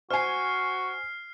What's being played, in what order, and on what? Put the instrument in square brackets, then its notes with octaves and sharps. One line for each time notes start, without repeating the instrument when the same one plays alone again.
[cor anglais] F#4 [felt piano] C5 G#5 [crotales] F6 C7